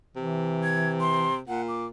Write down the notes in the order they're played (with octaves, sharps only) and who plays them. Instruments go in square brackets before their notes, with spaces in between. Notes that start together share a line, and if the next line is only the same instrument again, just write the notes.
[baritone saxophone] C3 [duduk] E3
[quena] G#6
C6
[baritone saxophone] A#2 [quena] F#5
[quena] D6